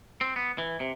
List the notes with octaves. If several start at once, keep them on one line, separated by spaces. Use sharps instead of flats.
C4
B3
E3
C3